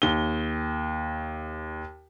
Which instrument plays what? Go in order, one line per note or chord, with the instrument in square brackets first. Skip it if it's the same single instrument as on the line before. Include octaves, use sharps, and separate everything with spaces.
[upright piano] D#2 G7